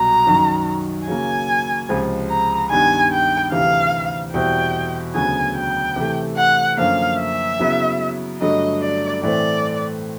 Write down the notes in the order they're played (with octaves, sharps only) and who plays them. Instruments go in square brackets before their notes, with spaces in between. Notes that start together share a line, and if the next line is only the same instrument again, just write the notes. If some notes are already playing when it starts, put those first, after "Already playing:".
Already playing: [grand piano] C2 B2 F#3 [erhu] A#5
[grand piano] F#2 D#3 F#3
[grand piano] C#3 F#3 A#3 [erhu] G#5
[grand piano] C#2 C3 F3 G#3
[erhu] A#5
[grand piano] G2 D#3 G3 B3 [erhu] G#5
[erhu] G5
[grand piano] D2 C3 E3 G3 [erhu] F5
[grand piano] E2 B2 G3 C4 E4 [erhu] G5
[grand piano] D2 C#3 F#3 B3 [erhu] G#5
[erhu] G5
[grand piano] C3 E3 A3
[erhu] F#5
[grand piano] F#2 D3 F3 A#3 [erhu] F5
[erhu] E5
[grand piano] C#3 F#3 B3 E4
[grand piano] G2 D3 F#3 A3 [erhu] D#5
[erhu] D5
[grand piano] A2 E3 A3 C4 [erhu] D5